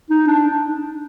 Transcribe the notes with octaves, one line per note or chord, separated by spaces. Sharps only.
D#4
D4